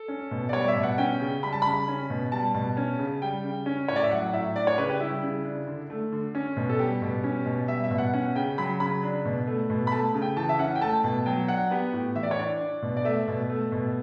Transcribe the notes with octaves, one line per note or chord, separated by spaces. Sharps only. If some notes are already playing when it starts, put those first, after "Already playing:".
Already playing: A4
C#4
B2
D5
G3 C#5
D5
E5
B2
F#5
C#4 G5
C#3
G3 B5
A5
C#3 B5
C#4
B2
G3 A5
B2
C#4
C#3
G3 G5
C#3
C#4
A2 C#5
D5
E5
F#3 F#5
A2 E5
D4 D5
C#5
C#3 B4
G4
G3 E4
C#3
D4
D3
A3
D3
C#4
B2
A4
G3 G4
B2
C#4
B2
G3 E5
E5
B2
F#5
C#4 F#5
C#3 G5
F#3 B5
C#3 B5
D4
B2
A3
B2
B5
A3 A5
C#3
G5
E3 A5
E5
C#4 F#5
G5
A3 A5
B2
F#3 G5
D4 F#5
B3 G4
A2
E3 E5
D5
C#5
D4 D5
D4
B2
D5
A3 E5
B2
A3
B2